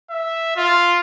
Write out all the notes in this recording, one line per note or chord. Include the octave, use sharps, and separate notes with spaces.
E5
F4